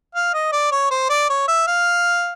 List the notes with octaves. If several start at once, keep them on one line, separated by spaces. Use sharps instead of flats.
F5
D#5
D5
C#5
C5
D5
C#5
E5
F5